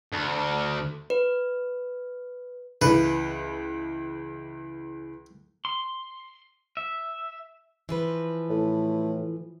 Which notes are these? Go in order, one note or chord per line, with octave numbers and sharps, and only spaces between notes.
D2
B4
C#2 E3 B4
C6
E5
E3 F3 B4
A2